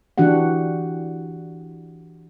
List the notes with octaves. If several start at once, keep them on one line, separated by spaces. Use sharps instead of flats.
E3 D4 F#4 G4 F#5